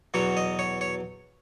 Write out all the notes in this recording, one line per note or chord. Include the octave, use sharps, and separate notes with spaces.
E2 B2 F#3 C#5
D#5
C#5
C#5